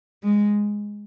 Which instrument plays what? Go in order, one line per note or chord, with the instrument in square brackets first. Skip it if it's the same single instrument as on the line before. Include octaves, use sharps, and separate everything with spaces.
[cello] G#3